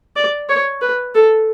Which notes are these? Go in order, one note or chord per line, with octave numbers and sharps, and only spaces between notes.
D5
C#5
B4
A4